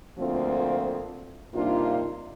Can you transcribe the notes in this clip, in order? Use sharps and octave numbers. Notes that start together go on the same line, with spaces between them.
D2 F3 A3 A#3 C4 F4
G2 C3 A#3 D4 D#4 F4